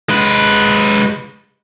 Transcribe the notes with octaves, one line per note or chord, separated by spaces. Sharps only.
G#3 B4